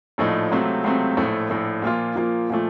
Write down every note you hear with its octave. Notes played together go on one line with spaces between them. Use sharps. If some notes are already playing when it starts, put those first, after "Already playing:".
A#1 A2 F3 A3 D#4
C#2 C3 F#3 A3 C4
C#2 C3 F#3 A3 C4
A#1 A2 A3
A#1 A2 A3
A#2 F3 A#3 F4
A#2 F3 A#3 F4
A#2 F3 A3